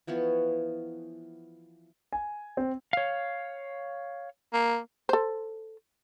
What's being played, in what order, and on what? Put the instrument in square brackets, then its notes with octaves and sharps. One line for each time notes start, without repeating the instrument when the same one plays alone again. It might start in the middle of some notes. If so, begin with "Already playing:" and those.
[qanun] E3 F3 B3 C#5
[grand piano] G#5
C4
[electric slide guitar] C#5 F5
[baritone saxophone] A#3
[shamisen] A4 C5